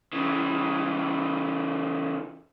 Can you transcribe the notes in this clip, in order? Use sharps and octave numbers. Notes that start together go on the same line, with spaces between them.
C#3 E3